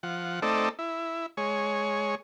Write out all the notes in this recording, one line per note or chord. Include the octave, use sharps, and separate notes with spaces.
F3 F#5
A3 C4 D#4 A4 D5
E4
G#3 C#5